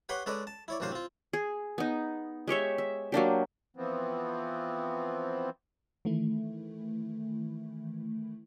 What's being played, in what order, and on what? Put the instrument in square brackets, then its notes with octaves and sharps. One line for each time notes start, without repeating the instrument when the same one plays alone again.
[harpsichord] G4 B4 C#5 F#5 B5 C6
G#3 C#4 A4 B4 D5 D#5
A5
E4 C#5 D5
A1 F#2 C3 D4 C5 F5
C4 F4
[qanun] G#4
B3 D#4
G#3 G4 C#5 E5
E5
F#3 A#3 D4 G4
[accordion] E3 F3 B3 C4
[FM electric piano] D#3 E3 A3 E4